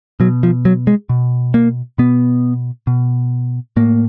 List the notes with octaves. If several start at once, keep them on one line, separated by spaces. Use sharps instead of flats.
B2 F#3
F3
F#3
G#3
B2
A#3
B2 B3
B2
A2 A#3